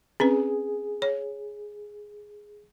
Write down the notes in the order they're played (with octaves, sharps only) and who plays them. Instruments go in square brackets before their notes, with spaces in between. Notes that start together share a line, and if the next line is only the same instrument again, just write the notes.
[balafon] C4 C#4 B4 [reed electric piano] G#4
[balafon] C#5